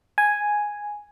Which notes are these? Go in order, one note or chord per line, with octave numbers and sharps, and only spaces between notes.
G#5